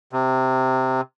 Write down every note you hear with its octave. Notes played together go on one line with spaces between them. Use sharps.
C3